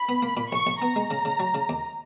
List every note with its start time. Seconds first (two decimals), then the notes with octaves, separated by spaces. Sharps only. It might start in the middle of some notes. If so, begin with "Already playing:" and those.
Already playing: B5
0.09 B3
0.22 A#3
0.37 A#2
0.51 A#1 C#6
0.67 A#1
0.81 B3 A#5
0.96 G#3
1.11 C#3
1.25 C#3
1.40 F#3
1.55 C#3
1.69 D#2